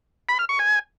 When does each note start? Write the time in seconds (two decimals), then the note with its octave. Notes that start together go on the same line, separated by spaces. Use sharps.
0.29 B5
0.39 F6
0.49 C#6
0.59 G#5